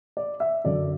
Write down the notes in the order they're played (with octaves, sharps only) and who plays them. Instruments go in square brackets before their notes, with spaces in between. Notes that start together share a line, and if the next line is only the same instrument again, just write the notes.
[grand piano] D5
E5
F#2 D3 F#3 D5